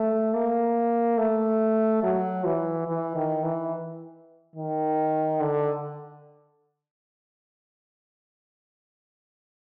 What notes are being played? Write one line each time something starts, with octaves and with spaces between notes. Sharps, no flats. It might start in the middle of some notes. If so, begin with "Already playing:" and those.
Already playing: A3
A#3
A3
F#3
E3
E3
D#3
E3
D#3
D3